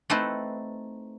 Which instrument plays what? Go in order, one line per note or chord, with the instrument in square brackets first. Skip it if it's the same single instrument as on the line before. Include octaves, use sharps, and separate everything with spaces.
[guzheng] A3 C4 D#4 E4 A4 B4